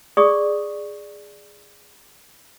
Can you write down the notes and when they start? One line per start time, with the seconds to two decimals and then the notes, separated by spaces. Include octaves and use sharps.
0.17 G#4 D5 C#6 D#6